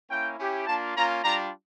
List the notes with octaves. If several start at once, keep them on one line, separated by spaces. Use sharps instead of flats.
A#3 C#4 E4 G5
C#4 E4 G4
A#3 D4 F4 A5
A#3 C#4 F4 A#5
G3 D4 F4 A#5